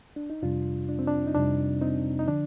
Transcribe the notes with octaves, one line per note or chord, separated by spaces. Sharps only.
D4
D#4
F2 C3 G3 D4 F4
D4
C4
D4
D#4
F2 C3 G3 D4
C4 D#4
D#4
D3 F3 D4